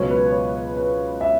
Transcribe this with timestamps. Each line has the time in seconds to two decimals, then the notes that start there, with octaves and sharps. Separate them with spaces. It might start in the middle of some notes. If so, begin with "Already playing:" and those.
Already playing: C#2 B2 F#3 B3 C#5
0.11 B4
0.32 C#5
0.77 B4
1.21 E5